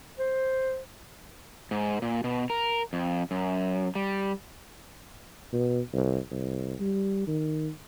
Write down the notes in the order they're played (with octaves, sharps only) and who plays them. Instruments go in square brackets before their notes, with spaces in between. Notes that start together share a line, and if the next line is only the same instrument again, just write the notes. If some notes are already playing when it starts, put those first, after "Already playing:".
[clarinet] C5
[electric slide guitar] G#2
A#2
B2
A#4
F2
F#2
G3
[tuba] B2
C2
C2
G3
D#3